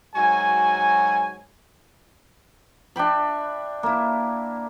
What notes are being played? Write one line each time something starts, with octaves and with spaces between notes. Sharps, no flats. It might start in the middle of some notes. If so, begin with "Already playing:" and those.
G#2 F#3 F#4 G#5
D4 E5 G5 B5
A#3 E4